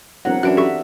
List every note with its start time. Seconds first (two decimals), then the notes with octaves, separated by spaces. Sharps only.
0.25 E1 F#3 C4 A#4 F#5
0.43 F#2 E3 D4 F#4 F#6 D7
0.57 B3 G4 A4 B4 E5 C#6